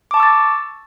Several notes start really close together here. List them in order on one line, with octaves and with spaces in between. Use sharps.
D6 A5 C#6 E6 A6